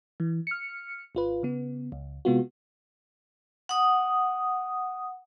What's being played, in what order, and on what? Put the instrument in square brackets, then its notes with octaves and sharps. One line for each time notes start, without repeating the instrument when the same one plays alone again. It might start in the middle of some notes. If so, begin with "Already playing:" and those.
[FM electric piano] E3
F6 C#7
G#1 F4 B4
C#3 B3
C#2
C3 G#3 B3 F4 F#4
[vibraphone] F#5 D#6